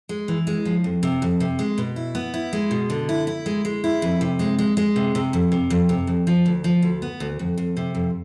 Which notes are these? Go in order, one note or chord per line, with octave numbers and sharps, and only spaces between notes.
G#3
E3
G#3
F3
F2
C3
F2
C3
G#3
B2
E4
B3
E4
G#3
B2
D3
E4
E4
G#3
G#3
E4
F2
C3
G#3
G#3
G#3
C3
C3
F2
C3
F2
C3
F2
F3
D2
F3
D2
B3
D2
F2
F2
C3
F2